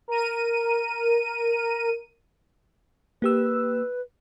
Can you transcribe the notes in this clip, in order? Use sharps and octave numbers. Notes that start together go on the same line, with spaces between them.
A#4 D#7
A#3 G4 B4 E6